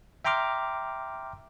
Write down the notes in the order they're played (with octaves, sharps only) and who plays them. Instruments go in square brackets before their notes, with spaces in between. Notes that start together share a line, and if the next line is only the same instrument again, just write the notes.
[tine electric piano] E5 G5 A#5 C6 D6 F6